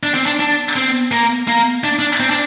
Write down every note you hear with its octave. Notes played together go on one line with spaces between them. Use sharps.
D4
C4
D4
D4
C4
A#3
A#3
D4
D4
C4
D4